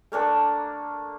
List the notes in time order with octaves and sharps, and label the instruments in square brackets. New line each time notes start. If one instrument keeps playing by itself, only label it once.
[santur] A3 A#3 D4 A4